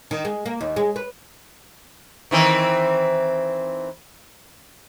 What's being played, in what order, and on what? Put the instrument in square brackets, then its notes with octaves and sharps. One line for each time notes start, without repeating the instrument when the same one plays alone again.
[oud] D#3
G#3
A#3
D#2
G#3
B4
[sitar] D#3 E3 C4